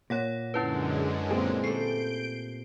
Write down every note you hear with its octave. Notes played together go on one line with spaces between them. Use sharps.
A#2 C#5 F#5 A#6
F#2 D3 G#3 C#4 E4 B4
A#2 C4 G#4
G3 A3 G6 C7 D7